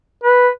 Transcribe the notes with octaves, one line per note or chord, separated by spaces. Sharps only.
B4